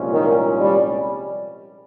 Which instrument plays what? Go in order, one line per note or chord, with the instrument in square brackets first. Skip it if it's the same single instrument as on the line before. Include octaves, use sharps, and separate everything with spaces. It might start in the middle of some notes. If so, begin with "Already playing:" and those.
Already playing: [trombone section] C2 A#2 F3 G#3 C#4
[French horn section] D#3
G3